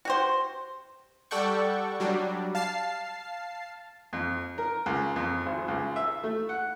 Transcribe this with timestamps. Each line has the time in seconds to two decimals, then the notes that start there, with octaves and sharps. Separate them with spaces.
0.05 F#4 G4 C5
1.31 G3 A4 D5 F#5 G5 C#6
2.00 F#3 G3 D4
2.55 F5 A5 A6 C7
4.13 F2
4.58 A#4
4.86 C#2
5.16 F2
5.46 G#1
5.68 C#2
5.96 E5
6.23 A3
6.49 F#5